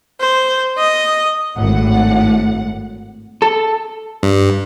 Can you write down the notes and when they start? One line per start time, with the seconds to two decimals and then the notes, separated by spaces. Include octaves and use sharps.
0.20 C5
0.78 D#5
1.57 G#1 A2 F#5
3.42 A4
4.23 G2